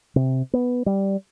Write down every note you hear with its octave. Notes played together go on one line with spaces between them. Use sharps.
C3
B3
G3